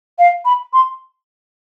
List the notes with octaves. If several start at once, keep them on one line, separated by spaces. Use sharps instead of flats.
F5
B5
C6